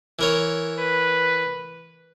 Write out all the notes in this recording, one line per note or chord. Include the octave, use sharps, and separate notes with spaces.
E3 A#4 C#5
B4